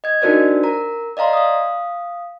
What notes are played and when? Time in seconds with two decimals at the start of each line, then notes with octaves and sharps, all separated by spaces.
0.04 D#5 G#6
0.22 D4 D#4 F#4 A#4 C5 D5
0.63 A#4 A#5
1.17 D5 D#5 F5 A#5 C6
1.33 F5 D#6